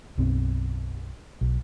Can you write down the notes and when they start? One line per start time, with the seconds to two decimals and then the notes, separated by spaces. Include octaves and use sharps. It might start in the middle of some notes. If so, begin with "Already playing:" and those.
0.18 B1 F#2 B2 C4
1.41 B1